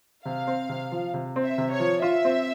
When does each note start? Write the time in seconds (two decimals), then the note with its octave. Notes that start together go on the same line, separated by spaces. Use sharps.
0.25 C3 F5
0.47 C4
0.69 C3
0.92 F3
1.14 C3
1.36 C4
1.43 E5
1.58 C3
1.72 C#5
1.80 F3
2.02 F4 E5
2.25 C4